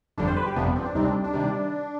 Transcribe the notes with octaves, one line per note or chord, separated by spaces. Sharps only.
G1 F2 D3 G3 D4
C5
B4
G4
G1 F2 C3 F3 B3 D4
C4
D4
D2 C3 G3 C4 D#4
D4
D4
C3 D#3 G3